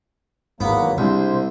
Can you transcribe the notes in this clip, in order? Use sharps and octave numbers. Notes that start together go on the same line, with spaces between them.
G#1 E2 G#2 F#3 A#3 B3
C2 C3 G#3 D4 C5